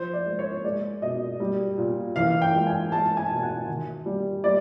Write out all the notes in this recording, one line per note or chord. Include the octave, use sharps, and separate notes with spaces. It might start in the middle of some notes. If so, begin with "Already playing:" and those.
Already playing: F3 C5
D5
G#3
C#5
G#3 D5
B2 D#5
G3
A#2
E3 F5
G5
G#3
G#5
G#3 A5
G#5
B2
F#5
D#3
G3
G3 D5